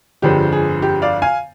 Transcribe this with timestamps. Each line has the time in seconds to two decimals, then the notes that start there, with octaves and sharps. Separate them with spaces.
0.22 G1 F2 D3 G#3 G4
0.52 G#4
0.82 G4
1.02 D5 F5
1.22 F5 G#5